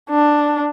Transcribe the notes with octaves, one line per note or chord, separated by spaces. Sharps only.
D4